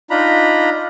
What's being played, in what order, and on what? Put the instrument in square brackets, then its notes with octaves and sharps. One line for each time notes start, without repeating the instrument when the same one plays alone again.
[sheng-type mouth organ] D4 D#4 F4 A#5 B5